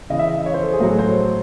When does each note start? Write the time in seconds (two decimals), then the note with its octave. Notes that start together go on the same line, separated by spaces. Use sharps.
0.10 C#3 E3 D#5
0.19 E5
0.28 D#5
0.46 C#5
0.54 C5
0.63 A4
0.72 G#4
0.80 A2 F#3 F#4
0.90 A4
0.99 C5
1.08 C#5